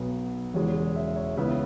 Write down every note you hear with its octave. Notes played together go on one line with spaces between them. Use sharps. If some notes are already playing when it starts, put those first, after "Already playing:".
Already playing: B1 B2 B3
E1 E2 C#3 G#3 C#5
E5
C#5
C#2 C#3 E3 B3 E5